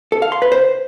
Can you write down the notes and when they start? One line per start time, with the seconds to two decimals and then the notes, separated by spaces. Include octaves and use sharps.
0.12 A4
0.22 F5
0.32 C6
0.42 B4
0.52 C5